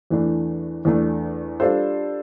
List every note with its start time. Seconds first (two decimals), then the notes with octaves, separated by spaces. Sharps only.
0.10 E2 E3 A3 D4
0.85 E2 E3 A3 D4
1.60 G3 D4 F4 A4 C5